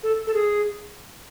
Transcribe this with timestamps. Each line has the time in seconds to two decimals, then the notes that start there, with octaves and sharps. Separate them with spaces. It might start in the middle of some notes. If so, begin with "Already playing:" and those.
0.03 A4
0.27 A4
0.34 G#4